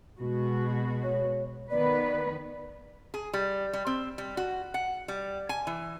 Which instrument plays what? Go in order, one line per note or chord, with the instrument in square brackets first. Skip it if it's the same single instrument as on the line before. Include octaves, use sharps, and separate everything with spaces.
[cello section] B2 G#3 F#4
[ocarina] C#5
[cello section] D#3 B3 B4 [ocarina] D5
[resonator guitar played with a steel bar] G#4
G3
G3
C4
G3
F#4
F#5
G3
G#5
E3